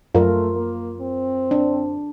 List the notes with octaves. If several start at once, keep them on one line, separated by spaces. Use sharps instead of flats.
F#2 A3 F4 A#4
A#3
C4
D4